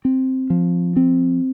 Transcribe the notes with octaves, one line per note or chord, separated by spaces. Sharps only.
C4
F3
C4